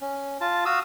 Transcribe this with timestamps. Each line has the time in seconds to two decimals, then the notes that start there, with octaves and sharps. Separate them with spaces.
0.01 C#4
0.41 F4 A5
0.65 F#4 F5 D#6 E6